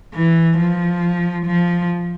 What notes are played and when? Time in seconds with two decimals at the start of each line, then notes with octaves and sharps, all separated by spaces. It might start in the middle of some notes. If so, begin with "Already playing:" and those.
0.15 E3
0.58 F3
1.46 F3